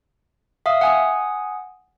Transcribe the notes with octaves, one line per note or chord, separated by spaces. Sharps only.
E5 F5 D#6
F#5 G#5 D#6